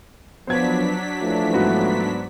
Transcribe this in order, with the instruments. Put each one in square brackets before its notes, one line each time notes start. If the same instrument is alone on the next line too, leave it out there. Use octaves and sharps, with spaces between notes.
[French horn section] F3 B3 [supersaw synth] F#3 D4 B6 [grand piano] C5 G#6
[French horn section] E3 F3 A3
[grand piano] G#2 B3 F#4